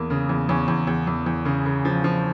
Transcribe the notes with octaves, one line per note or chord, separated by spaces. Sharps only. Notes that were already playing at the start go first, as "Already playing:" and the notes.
Already playing: E2 A#3
C#3
E2
E2 C#4
E2
E2
E2
E2
C#3
C#3
F3
F3